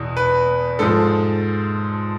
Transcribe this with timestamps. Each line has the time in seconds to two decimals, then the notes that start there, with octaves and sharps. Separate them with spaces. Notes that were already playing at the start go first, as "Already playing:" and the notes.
Already playing: E2 B2
0.17 B4
0.79 G#2 F3 A4